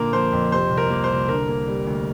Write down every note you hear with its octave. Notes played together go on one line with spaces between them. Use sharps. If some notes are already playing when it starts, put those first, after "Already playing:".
Already playing: A#2 D3 A#3 A#4
F3 C5
F2
C3 C5
C2
A#4
A#3
C5
C2
D3 A#4
A#3
G3
D2